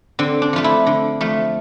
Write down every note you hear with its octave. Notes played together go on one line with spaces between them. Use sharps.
D3 C4
D4
F3 A3 F4
E4
D3
F3 A3